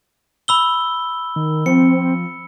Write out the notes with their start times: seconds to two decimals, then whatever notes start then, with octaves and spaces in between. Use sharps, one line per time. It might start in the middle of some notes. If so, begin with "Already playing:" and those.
0.48 B5 E6 G7
1.36 D#3
1.66 F3 C4 C#7